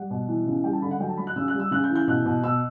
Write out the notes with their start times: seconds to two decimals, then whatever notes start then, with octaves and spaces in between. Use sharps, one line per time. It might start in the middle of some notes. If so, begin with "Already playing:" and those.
Already playing: G3 F#5
0.11 B2
0.28 E3
0.46 C#3
0.64 G3 G5
0.73 A5
0.82 D3 B5
0.91 F#5
1.00 F#3 G5
1.09 A5
1.17 F#3 B5
1.27 F#6
1.36 C#3 E6
1.48 F#6
1.54 G3
1.60 E6
1.71 C#3 F#6
1.84 G6
1.90 E3
1.95 G6
2.08 B2 F#6
2.26 B2
2.44 B2 E6